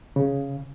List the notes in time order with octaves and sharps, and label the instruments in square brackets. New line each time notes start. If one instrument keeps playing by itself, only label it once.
[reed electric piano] C#3